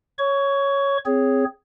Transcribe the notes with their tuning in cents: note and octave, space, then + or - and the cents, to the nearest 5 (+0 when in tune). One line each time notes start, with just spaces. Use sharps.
C#5 +0 C#6 +20
C4 -5 G#4 +0 C#5 +0